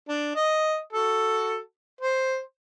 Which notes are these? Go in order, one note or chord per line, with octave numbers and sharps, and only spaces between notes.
D4
D#5
F#4 A4
C5